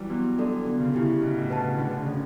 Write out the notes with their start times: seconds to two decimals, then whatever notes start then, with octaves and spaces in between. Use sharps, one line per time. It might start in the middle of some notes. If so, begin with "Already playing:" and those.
Already playing: E3 F#3 G3
0.10 F#3 B3
0.38 D4 F#4 A4 D5
0.66 D3 B3
0.80 C#3
0.94 C#3 E4 G4
1.22 B2 E4
1.37 A2
1.50 B4 F#5 A5
1.64 C#3
1.78 D3 A3
1.90 D3
1.97 C#3
2.06 C#4 F#4 A4 D5